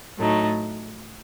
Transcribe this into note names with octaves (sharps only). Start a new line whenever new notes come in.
A2 F#3 A3 D#4